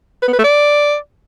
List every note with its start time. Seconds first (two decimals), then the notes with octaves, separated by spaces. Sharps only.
0.23 B4
0.28 B3
0.33 B4
0.39 A3
0.44 D5